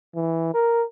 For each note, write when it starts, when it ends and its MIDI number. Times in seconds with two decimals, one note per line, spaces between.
0.16 0.50 52
0.54 0.84 70